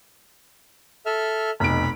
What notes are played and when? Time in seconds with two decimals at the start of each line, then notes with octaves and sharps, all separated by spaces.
1.06 A4 E5 F6
1.60 F1 B1 B5 D7